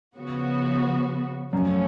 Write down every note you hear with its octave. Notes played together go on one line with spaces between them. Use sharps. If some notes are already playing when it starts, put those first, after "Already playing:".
C#3 F3 B3 F#4
F#2 F3 A3 C#4